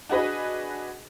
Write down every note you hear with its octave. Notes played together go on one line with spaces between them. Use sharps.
D4 F#4 G#4 B4 D#5